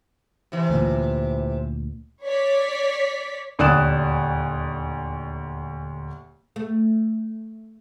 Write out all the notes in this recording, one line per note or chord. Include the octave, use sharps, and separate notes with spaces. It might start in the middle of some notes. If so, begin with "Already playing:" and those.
C3 E3
D2 A#2
C#5 D5 B6
D#1 D2 D5 D#6 F#6 E7
A3